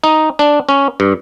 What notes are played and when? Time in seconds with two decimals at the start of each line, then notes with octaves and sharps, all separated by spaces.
0.04 D#4
0.39 D4
0.69 C#4
1.00 G2